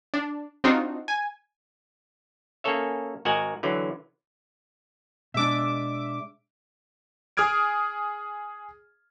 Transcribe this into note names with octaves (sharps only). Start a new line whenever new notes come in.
D4
C4 D4 D#4 F4 F#4
G#5
A#3 C#4 G#4 A4 C#5 E5
G#1 F#4 A#4 D#5 F#5 G#5
D3 E3 F#3
B2 G#3 D4 E5 D6
G#4 D#6 F6 G#6 D7